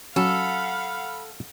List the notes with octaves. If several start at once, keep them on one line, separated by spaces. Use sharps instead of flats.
F#3 C#4 A4 F5 F#5 B5